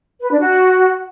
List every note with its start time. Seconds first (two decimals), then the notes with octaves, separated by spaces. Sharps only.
0.21 B4
0.30 D4
0.40 F#4